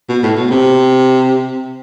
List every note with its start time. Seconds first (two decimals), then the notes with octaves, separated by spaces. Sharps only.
0.09 B2
0.23 A2
0.37 B2
0.50 C3